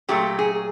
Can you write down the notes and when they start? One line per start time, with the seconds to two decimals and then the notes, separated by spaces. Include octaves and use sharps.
0.09 A#2 F#3 A3 G4
0.39 G#4